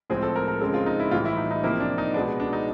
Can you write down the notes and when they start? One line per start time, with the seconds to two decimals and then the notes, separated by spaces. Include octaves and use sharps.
0.10 A2 F3 G#3 C4 G#4
0.23 A4
0.36 A#4
0.48 A#4
0.61 C#3 F3 G#3 C4 A4
0.74 F4
0.86 D#4
1.00 E4
1.11 A2 E3 G3 F4
1.25 E4
1.37 D#4
1.51 D#4
1.63 C3 F3 A#3 E4
1.80 D4
1.98 D#4
2.14 B2 G#3 B3 D4
2.40 D4
2.53 D#4